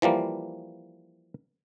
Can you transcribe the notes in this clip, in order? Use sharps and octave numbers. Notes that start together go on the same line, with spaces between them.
E3 F3 G3 A#3